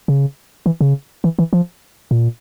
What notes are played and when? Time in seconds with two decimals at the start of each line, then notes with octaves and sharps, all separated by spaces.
0.08 C#3
0.66 E3
0.81 C#3
1.24 E3
1.39 E3
1.53 F3
2.11 A#2